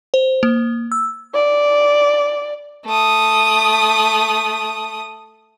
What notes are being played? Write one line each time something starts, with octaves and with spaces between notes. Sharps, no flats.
C5
A#3
E6
D5
A3 D#6